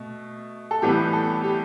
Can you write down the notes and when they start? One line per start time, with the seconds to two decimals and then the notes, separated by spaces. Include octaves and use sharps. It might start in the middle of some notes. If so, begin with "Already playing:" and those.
Already playing: B2 A3
0.71 A4
0.82 A2 E3 G3 B3 G4
1.13 A4
1.44 G4